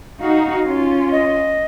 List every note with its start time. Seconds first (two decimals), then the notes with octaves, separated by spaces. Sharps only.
0.19 D#4 F#4 F5
0.66 C#4 F4
1.11 D#5